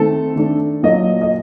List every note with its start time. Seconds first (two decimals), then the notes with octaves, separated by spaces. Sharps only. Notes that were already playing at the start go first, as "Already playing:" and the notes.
Already playing: D#3 A3 C4 A4
0.36 D#3 A3 D4
0.83 A#2 F#3 A#3 D#5
1.22 D#5